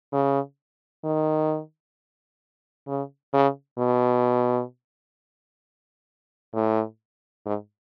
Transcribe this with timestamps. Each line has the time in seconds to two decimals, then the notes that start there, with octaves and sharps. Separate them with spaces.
0.12 C#3
1.04 D#3
2.87 C#3
3.34 C#3
3.78 B2
6.54 A2
7.46 G#2